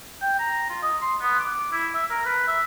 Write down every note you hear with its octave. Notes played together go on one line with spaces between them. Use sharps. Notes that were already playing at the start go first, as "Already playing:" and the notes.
G5
A#5
F4
D#5
C6
B3
D6
E4
E5
A#4
B4
E5